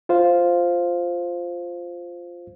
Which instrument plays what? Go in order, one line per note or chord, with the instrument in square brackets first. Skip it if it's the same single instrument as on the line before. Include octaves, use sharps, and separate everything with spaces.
[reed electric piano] F4 C5 F5